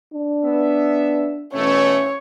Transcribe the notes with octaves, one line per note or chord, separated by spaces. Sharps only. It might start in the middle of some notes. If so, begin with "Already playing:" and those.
D4
B3 E5
B2 E3 A3 C#4 C#5